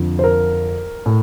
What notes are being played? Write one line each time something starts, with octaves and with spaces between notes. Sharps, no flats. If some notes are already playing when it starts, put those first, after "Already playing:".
Already playing: F2 D3 F3
C5
A#4
A2